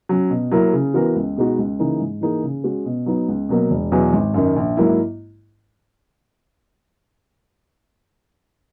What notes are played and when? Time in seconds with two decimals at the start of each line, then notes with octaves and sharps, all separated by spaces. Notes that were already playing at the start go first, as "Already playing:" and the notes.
0.09 F#3 C#4
0.30 B2
0.51 F#3 A#3 E4 A#4
0.73 C#3
0.94 E3 B3 F#4 A#4
1.16 C#2
1.37 B2 G#3 D#4 F#4
1.58 C#2
1.79 C#3 E3 A#3 D#4
2.00 G#2
2.21 E3 A#3 D#4 G#4
2.43 C#3
2.64 G#3 C#4 F#4
2.86 B2
3.06 F#3 B3 D#4
3.28 C#2
3.49 B2 F#3 A#3
3.71 E1
3.92 E2 B2 F#3 B3
4.13 G#1
4.34 F#2 D#3
4.56 A#1
4.77 G#2 F#3 A#3 E4